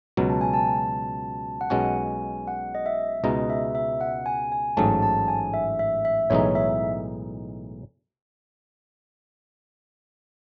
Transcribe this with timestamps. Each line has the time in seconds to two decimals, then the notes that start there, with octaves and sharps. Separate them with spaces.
0.17 C#2 B2 F#3
0.30 A5
0.41 G#5
0.54 A5
1.61 F#5
1.70 B1 B2 G#3 C#4 F#4 G#5
2.48 F#5
2.75 D#5
2.86 E5
3.24 C#2 B2 G#3 D#4 D#5
3.50 E5
3.75 E5
4.01 F#5
4.26 G#5
4.52 G#5
4.77 A1 G#2 F#3 A3 A5
5.02 A5
5.28 G#5
5.54 E5
5.79 E5
6.05 E5
6.30 B1 A2 E3 G#3 D#4 C#5
6.55 E5